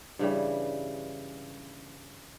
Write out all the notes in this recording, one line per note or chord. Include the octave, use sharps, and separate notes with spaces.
G2 C#3 E3 G3